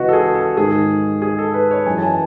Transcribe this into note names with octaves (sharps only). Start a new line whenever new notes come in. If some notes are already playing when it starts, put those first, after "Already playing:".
Already playing: C#2 C#3 E3 F#4 B4 D#5
A4
G#4
A4
G#2 D#3 G#4
G#4
A4
B4
C#5
F#2 E3 G#5
A5
G#5